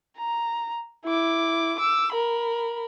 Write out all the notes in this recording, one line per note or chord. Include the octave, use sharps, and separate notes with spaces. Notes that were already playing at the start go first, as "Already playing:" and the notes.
A#5
E4 D6
D6 E6
A#4 B5